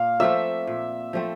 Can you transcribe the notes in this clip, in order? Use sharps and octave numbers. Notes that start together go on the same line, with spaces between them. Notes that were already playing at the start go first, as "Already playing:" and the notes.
Already playing: A#2 F5
F3 A3 C4 E5
A#2
F3 A3 C4